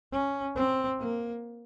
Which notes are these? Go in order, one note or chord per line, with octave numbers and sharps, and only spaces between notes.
C#4
C4
A#3